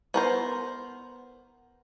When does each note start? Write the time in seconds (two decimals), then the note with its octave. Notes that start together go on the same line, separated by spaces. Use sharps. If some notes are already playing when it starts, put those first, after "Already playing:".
0.14 B3 A#4 C5